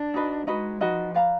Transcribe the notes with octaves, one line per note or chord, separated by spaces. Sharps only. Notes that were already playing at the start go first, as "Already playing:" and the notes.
Already playing: D4
D#4 F#4 B4 D#5
G#3 D#4 F#4 B4 D#5
F3 D#4 F#4 B4 D#5
B4 D5 F5 A#5